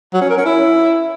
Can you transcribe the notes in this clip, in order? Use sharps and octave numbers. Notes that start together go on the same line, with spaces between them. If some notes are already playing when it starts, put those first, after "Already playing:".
F#3
C#4
A#4
C#4
E4